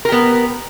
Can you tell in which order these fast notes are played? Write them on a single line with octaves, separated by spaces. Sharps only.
A#4 G4 B3